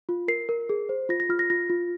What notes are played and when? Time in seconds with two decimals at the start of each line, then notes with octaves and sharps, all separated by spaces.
0.09 F4
0.28 A#4 C7
0.49 A#4
0.69 G#4
0.89 C5
1.09 F4 A#6
1.20 A#6
1.29 F4 F6
1.39 A#6
1.50 F4 A#6
1.70 F4